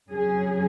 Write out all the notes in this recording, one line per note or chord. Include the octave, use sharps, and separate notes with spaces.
F2 C#3 F#3 C#4 G#4